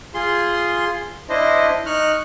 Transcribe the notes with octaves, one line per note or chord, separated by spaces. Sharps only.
F4 G#4 C6
D4 E4 C5 D#5
D#4 C#6 F6 F#6